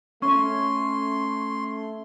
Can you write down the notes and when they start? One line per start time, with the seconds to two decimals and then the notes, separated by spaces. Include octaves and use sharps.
0.22 A3 C#4 C6 C#6